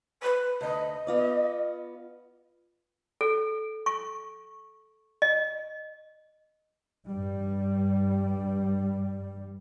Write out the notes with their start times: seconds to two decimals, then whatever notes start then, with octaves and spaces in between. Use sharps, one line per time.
0.22 B4
0.61 D2 B4 D#5
1.07 B3 F4 D5
3.21 A4
3.86 C#6
5.22 D#5
7.05 G2 G3